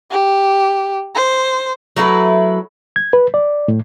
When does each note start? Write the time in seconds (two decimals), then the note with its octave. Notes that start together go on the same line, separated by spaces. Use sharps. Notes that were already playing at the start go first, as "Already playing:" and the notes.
0.11 G4
1.15 C5
1.96 F#3 A3 E4 B4
2.96 G#6
3.13 B4
3.34 D5
3.68 A2